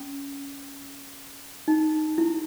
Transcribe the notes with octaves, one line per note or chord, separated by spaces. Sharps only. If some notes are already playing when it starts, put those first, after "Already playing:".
Already playing: C#4
D#4
E4